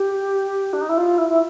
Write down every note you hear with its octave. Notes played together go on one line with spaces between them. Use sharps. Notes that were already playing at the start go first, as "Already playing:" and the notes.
Already playing: G4
D4
D#4
E4
F4
E4
E4